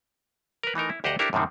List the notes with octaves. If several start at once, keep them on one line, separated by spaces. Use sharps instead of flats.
A#4 B4
E3 A3 D#4 A#4
E4
D2 G4 C5 D#5 F#5 A#5
D4 E4 G4 A4 A#4 C5
F#2 A2 C3 D#3 C4